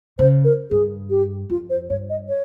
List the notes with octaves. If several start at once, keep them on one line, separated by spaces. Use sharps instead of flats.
C#3 C5
A#4
G2 G#4
G4
F2 F4
C5
G2 C#5
D#5
C#5